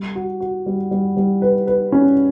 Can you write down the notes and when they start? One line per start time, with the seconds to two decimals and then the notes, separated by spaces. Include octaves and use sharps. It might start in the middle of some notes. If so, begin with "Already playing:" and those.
Already playing: G3
0.15 F#4
0.40 F#4
0.66 G3
0.91 G3
1.17 G3
1.42 B4
1.67 B4
1.92 C#4